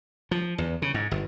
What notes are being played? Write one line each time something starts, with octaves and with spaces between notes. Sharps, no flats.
F3
E2
C#3
G#2
G1